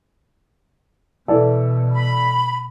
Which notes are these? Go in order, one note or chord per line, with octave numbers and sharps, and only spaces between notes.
B2 E3 A4 D5
B5